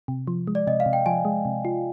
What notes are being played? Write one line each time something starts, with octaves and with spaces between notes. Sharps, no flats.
C3
F3
G#3
D5
C3 D#5
F5
C3
G5
F3 G#5
G#3
C3
F4